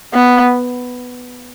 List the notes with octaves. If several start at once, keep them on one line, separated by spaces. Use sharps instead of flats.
B3